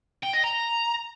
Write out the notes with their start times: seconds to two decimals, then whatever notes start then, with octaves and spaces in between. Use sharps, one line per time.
0.23 G5
0.34 D#5
0.44 A#5